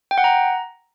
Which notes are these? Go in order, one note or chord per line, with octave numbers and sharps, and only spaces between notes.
G5
F#5
A#5